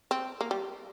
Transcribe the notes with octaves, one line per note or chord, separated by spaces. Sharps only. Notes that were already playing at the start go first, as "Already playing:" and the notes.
C4
A#3
G3